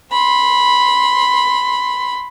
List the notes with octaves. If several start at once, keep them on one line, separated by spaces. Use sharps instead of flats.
B5 C6